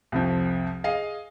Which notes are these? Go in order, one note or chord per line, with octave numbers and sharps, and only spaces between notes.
C2 F2 F3
G#4 D#5 F5